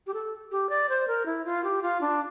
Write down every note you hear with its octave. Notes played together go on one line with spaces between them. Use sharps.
G4
A4
G4
D5
C5
A#4
E4
F4
G4
F4
D4